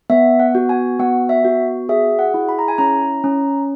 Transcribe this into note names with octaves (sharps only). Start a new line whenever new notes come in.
B3 E5
F#5
F#4
G#5
B3 F#5
E5
F#4
G#4 E5
F#5
E4
B5
A#5
G#5
C#4 A#5
C#4